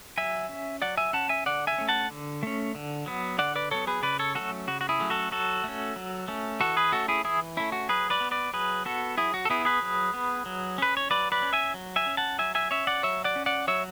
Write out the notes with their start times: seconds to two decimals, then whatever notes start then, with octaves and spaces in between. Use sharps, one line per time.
0.17 F#3 E5 G#5
0.49 C#4
0.82 F#3 D5 F#5
0.97 E5 G#5
1.13 C#4 F#5 A5
1.29 E5 G#5
1.46 D3 D5 F#5
1.67 E5 G#5
1.78 A3 C#4
1.89 F#5 A5
2.10 D3
2.43 A3 C#4
2.75 D3
3.06 F#3 B3
3.38 D3 D5 F#5
3.55 B4 D5
3.71 F#3 B3 A4 C#5
3.87 G#4 B4
4.02 C#3 B4 D5
4.19 A4 C#5
4.35 F#3 A3 C#4 F#4 A4
4.67 C#3 F#4
4.81 F#4
4.89 E4 G#4
5.00 F#3 A3 C#4
5.10 F#4 A4
5.31 F#3 F#4 A4
5.64 A3 C#4
5.96 F#3
6.28 A3 C#4
6.60 E3 F#4 A4
6.77 G#4 B4
6.92 A3 C#4 F#4 A4
7.08 E4 G#4
7.25 E3 E4 G#4
7.57 A3 C#4 E4
7.72 F#4
7.89 F#3 G#4 B4
8.10 B4 D5
8.21 B3
8.31 B4 D5
8.53 F#3 G#4 B4
8.85 B3 F#4 A4
9.18 F#3 E4 G#4
9.34 F#4
9.45 A4
9.50 B3 E4 G#4
9.65 G#4 B4
9.82 F#3
10.14 B3
10.46 F#3
10.78 C#4 B4
10.97 C#5
11.10 F#3 B4 D5
11.32 B4 D5
11.42 C#4
11.53 E5 G#5
11.74 F#3
11.96 E5 G#5
12.06 C#4
12.17 F#5 A5
12.38 F#3 E5 G#5
12.55 E5 G#5
12.71 C#4 C#5 E5
12.87 D5 F#5
13.03 F#3 C#5 E5
13.24 D5 F#5
13.36 C#4
13.46 D5 F#5
13.67 F#3 C#5 E5